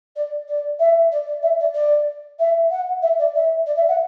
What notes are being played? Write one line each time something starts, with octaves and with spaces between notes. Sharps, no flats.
D5
D5
E5
D5
D5
E5
D5
D5
E5
F#5
E5
D5
E5
D5
E5
F#5